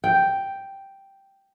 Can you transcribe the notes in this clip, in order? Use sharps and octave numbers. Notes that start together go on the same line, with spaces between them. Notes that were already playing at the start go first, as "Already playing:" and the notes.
G5